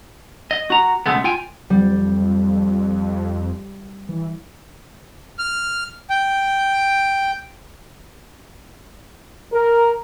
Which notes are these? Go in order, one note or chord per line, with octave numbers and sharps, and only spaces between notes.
D#5
F#4 A#5
C#2 B2 G#3 A3 B3
F4 G5 G#5
F2 G3
E3
F6
G5
A#4